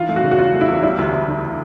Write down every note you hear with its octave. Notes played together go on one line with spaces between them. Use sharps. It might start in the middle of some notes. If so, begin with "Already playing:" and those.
Already playing: D#3 E3 F4
A3
F#4
C#3
F#4
E2 F4
A3
E4
E2
G3 E4
D2
D2
D3